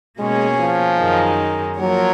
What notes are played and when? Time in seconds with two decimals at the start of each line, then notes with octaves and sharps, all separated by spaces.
0.19 B2 G#3 A#3 C#4 G#4 C#5
0.60 F3
1.00 F#2 D#3 G#3 D#4
1.79 F3 F#3 A#3 F4 A#4 C#5